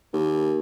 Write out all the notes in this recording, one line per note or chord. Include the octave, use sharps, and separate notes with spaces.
D#2